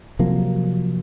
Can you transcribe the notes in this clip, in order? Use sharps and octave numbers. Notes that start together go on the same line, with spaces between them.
C3 F3 F#3 A#3